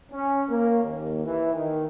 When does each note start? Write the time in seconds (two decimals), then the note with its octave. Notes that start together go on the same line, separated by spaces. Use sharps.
0.12 C#4
0.49 A#3
0.83 D#2
1.25 E3
1.54 D#3